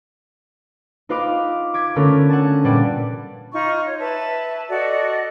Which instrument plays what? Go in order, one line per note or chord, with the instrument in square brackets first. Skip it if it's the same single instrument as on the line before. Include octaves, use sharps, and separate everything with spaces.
[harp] D#4 F4 B4 F5 B5 D6
D6 G#6 B6
D3 A3 B3 C#4 A#4
F#5 G#5 A5
A#2 G3 B4 D5
[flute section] D#4 F4 C#6
C#5
B4 E5 A5
F#4 A4 D5 D#5